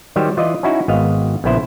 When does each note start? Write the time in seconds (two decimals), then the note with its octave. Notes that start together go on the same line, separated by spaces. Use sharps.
0.16 D#3 F#3 G3 G4 C5
0.37 E3 F4 D5 D#5
0.63 C#4 D#4 E4 F#4
0.88 G#1 B3 D#5 F5
1.44 A#1 C#3 B3 E4 C5